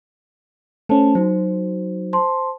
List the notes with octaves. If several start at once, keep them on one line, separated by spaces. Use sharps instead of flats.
A3 C#4 C5 A5
F#3 D#4 F#4 C5
C5 A5 C6